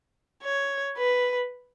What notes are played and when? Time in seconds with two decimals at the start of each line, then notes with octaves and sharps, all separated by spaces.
0.43 C#5
0.98 B4